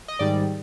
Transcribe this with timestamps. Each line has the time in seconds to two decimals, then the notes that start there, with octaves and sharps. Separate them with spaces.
0.08 D#5
0.19 G#2 D#3 G3 D5